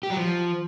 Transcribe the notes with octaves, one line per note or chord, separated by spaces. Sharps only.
G4
F#3
F3